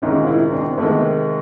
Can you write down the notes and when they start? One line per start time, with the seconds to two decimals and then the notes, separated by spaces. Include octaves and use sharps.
0.02 D2 C3 D#3 G#3 C#4 D#4
0.18 F4
0.27 D4 E4
0.48 D#4
0.53 C4 D4
0.77 D2 C3 D#3 G#3 A3 B3